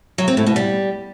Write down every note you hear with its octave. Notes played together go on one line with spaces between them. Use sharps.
F#3
C4
A2
B2
G3